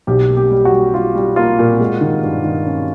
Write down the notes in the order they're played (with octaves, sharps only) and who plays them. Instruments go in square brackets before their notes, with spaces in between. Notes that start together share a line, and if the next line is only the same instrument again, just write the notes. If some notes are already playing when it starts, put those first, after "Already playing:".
[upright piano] B1 [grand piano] G4
[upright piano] A#3
[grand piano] G4
[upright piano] G3
[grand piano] F#4
[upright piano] G3
[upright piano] G3 [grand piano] F4
[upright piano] G3
[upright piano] A#3 [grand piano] F4
[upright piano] A#2
G#3
D#3
G2
D#3
C#4